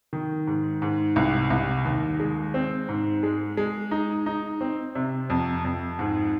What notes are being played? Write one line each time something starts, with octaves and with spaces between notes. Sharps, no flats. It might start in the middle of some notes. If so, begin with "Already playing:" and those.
D#3
G#2
G#2
C2
C2
D#2
G#3
C4
G#2
G#3
G#3
D#4
D#4
C4
C3
F2
F2
G#2